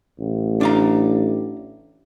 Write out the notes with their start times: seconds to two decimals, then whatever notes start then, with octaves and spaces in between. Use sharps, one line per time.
0.19 A1
0.61 D4 F5 A#5